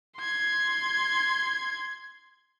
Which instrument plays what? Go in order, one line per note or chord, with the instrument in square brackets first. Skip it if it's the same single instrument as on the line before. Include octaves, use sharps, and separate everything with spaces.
[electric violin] C6 G#6